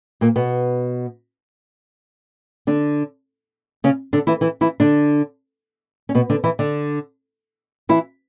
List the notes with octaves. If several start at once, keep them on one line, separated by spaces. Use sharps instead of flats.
A#2 A#3
B2 B3
D3 D4
C#3 C#4
D3 D4
E3 E4
E3 E4
E3 E4
D3 D4
C#4
B2 B3
D3 D4
E3 E4
D3 D4
E3 E4